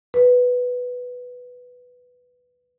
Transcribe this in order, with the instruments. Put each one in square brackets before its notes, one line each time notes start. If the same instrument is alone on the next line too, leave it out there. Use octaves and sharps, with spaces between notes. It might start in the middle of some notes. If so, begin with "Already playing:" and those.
[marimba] B4